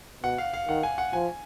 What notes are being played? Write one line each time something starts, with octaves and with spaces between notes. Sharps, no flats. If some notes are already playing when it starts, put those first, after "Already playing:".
B2 F#5
F5
F5
D#3 F#5
G#5
F#5
F3 G#5